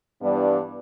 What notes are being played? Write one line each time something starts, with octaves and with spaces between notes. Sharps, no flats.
G2 E3 G3 B3 D4